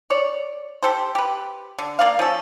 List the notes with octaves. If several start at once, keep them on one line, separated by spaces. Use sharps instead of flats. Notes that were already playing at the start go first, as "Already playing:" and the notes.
C#5 D5
G4 A4 C5
G4 B4
D3
A#3 D5 F5
F3 C#4 A4